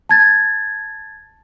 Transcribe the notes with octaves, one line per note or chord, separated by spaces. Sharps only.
A5 G#6 A6